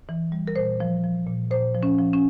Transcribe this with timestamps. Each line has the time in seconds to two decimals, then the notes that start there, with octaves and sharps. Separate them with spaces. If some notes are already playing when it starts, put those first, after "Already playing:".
0.09 E3
0.32 G3
0.48 A#4
0.56 A#2 C5
0.80 F3
1.04 F3
1.27 A#2
1.50 A#2 C5
1.74 F3
1.83 C#4
1.98 F3
2.13 C#4